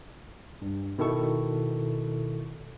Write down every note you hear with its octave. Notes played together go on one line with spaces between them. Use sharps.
G2
B2 D#3 E4 A4 C#6